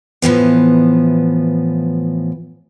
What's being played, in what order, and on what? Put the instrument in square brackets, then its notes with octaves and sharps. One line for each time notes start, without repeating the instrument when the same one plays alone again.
[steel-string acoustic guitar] A2 E3 F3 B3